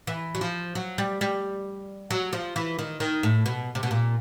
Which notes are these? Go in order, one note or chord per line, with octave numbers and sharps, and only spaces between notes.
E3
F#3
F3
F#3
G3
G3
F#3
F3
E3
D#3
D#3
A2
B2
C3
B2
A#2